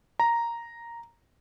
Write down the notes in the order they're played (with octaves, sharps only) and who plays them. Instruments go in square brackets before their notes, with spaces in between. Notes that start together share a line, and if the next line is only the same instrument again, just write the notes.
[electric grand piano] A#5